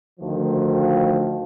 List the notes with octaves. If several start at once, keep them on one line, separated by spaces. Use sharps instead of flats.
D2 D#3 F3